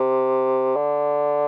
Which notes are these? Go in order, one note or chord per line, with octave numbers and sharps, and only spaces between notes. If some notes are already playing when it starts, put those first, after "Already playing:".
Already playing: C3
D3